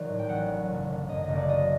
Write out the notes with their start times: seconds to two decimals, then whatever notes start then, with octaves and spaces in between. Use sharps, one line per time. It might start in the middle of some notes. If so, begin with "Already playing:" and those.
Already playing: D#3 F#3 C5 D5
0.09 A2
0.19 G5
0.29 A1 F#5
0.49 F#3
0.69 F#1
0.89 D3
1.08 F#2 D#5
1.22 D#5
1.29 F#1
1.36 D5
1.48 F#3 D#5